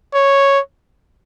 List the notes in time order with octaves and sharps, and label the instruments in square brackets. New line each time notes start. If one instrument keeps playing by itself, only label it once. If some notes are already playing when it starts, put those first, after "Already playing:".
[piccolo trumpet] C#5